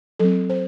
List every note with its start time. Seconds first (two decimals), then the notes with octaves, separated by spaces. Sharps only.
0.19 F#3 C4 A4
0.50 C5